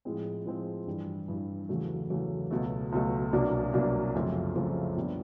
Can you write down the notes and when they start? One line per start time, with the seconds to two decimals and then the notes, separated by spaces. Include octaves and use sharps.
0.05 A2 F3 G#3 C4
0.46 A2 F3 G#3 C4
0.87 G2 E3 G3
1.28 G2 E3 G3
1.69 E2 C#3 F#3 A3
2.10 E2 C#3 F#3 A3
2.51 C#2 B2 F#3 A3
2.92 C#2 B2 F#3 A3
3.33 C2 B2 F#3 A#3 D4
3.73 C2 B2 F#3 A#3 D4
4.14 F#2 C#3 F3 A3 C4
4.56 F#2 C#3 F3 A3 C4
4.96 A#2 G3 B3 D4